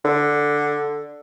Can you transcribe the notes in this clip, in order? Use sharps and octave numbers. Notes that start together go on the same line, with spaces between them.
D3